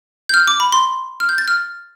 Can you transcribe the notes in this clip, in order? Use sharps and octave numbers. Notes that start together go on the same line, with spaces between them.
G6
F6
D6
B5
C6
F6
G6
A6
F6